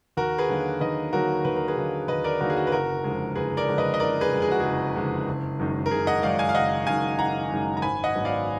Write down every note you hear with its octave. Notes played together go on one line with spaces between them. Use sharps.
D#2 F#4 A#4
G#4 B4
D3 F#3 A#3 D#4
D#2 B4 D#5
D3 F#3 A#3 D#4 F#4 A#4
D#2 B4
A#4
G#4 B4
D3 F#3 A#3 D#4
D#2 B4 D#5
A#4 D5
D3 F#3 A#3 D#4 F#4 A#4
G#4
F#4
B4
F#1 F#4 A#4
F2 D3 G#3
F#1 G#4 B4
A#4 D5
F2 D3 G#3
B4 D#5
D#5
F#1 A#4 D5
G#4 B4
F2 D3 G#3
G#4
F#4
F#1 G#4
F2 D3 G#3
F#1
F#2 D#3 G#3 D#4
A#4
F#1 G#4
D#5 F#5
F#2 D#3 G#3 D#4 D5 F5
F5 G#5
F5
F#1 D#5 F#5
F#2 D#3 G#3 D#4 F5 G#5
F#1 F#5 A#5
F#2 D#3 G#3 D#4
A#5
G#1 G#5 B5
D#5 F#5
G#2 F#3 B3
D5 F5